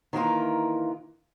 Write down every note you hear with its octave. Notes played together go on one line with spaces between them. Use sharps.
D#3 E3 A#3 F4